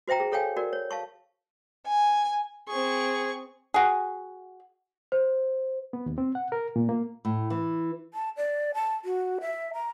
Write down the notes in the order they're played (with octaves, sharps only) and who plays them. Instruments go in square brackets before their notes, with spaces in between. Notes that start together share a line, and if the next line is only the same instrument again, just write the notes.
[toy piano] F#4 C5 E5 G5 A#5
G#4
G#4 A4 C#5 F5 G5 G#5
F#4 A#4 D5
C#5
F5 A5 C#6
[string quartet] G#5
[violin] C4 C#6 [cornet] G#4
[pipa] F#4 G#4
[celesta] C5
[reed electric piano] B3
D#2
C4
F#5
A#4
A#2
A#3
[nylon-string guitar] A2
E3
[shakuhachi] A5
D5
A5
F#4
E5
A#5